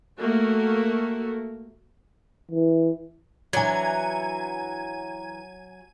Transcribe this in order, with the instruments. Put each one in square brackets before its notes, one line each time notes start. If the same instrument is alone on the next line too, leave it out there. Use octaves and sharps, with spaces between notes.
[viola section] A3 A#3 F#4
[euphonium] E3
[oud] E3 D4 [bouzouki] F#3 [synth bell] G#5 G#6 [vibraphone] A#5